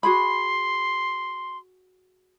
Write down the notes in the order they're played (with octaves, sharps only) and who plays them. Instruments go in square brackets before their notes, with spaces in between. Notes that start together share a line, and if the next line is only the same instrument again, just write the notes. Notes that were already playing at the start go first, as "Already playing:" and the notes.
[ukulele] F#4 G#4 B5 [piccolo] C6